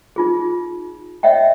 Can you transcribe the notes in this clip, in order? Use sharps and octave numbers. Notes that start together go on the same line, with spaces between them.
D#4 F4 G#4
C#5 D#5 E5 F#5 G5